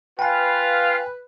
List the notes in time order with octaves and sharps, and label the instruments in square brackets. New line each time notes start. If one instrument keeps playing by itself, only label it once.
[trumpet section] F4 F5 [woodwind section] B4 [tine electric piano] G5 G#5